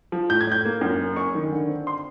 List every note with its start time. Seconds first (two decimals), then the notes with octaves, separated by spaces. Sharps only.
0.12 F3
0.30 A2 G6
0.41 G#6
0.47 A2 G6
0.65 A#3
0.81 F#2
0.99 F#1
1.16 F#1 C#6
1.35 D#3
1.52 D3
1.68 C4
1.87 C6